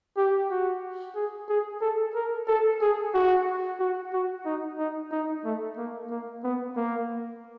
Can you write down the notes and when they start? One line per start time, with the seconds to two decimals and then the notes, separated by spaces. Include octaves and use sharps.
0.17 G4
0.50 F#4
1.16 G#4
1.49 G#4
1.82 A4
2.15 A#4
2.48 A4
2.81 G#4
3.14 F#4
3.80 F#4
4.13 F#4
4.45 D#4
4.79 D#4
5.12 D#4
5.45 A3
5.77 A#3
6.11 A#3
6.44 B3
6.76 A#3